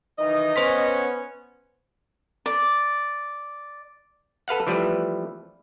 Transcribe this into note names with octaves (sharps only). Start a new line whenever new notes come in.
D#3 E3 D#4 D#5
B3 C#4 C5 C6 B6
D5
A4 B4 F5 F#5
E3 F3 G3 A3 B4